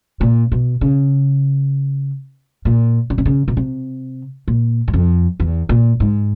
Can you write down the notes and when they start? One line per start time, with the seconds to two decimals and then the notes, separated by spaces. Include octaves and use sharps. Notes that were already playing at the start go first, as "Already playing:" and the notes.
0.21 A#2
0.52 B2
0.81 C#3
2.65 A#2
3.10 C#3
3.18 C3
3.25 C#3
3.48 B2
3.57 C3
4.48 A#2
4.88 F#2
4.93 F2
5.40 E2
5.69 A#2
6.00 G#2